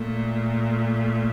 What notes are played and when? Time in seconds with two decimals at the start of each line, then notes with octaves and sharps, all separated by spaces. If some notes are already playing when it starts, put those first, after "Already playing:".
Already playing: A#2 A3